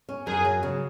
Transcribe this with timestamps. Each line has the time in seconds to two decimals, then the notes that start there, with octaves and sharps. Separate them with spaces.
0.09 C#4
0.27 F#2 G#4
0.45 F#3
0.63 C#3